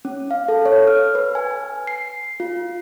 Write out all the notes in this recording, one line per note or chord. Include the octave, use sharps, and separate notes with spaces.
C#4
F5
A4
C#5
F6
B4
G#5
G#5
C7
F4